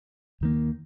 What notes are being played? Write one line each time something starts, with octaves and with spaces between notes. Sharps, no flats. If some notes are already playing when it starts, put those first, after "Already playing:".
D#2 D#3 A#3